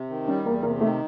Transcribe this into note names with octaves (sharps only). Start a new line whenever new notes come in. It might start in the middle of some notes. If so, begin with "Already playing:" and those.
Already playing: C3
D#3
G3 C#4
E2 A#3
C3 A#3
D#3 A3